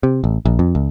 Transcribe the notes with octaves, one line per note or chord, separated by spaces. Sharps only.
C3
A1
A#1
F2
C#2